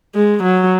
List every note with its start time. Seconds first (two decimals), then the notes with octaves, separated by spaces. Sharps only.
0.15 G#3
0.43 F#3